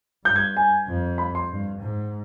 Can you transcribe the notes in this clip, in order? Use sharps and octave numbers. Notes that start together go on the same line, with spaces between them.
G2 G6
G#6
G#5
F2
B5
C6
G2
G#2